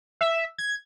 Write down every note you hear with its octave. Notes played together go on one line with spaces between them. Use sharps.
E5
G#6